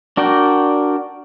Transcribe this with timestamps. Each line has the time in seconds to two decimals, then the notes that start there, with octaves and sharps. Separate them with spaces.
0.17 D4 F#4 A#4 D5 G5